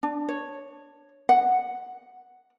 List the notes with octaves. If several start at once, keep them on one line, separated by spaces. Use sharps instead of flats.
D4
C#5
F#5